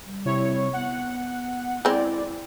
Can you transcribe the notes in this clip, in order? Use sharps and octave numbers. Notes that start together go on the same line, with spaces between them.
G3
C3 E4 C#5
B3 F#5
G#3 C4 E4 D5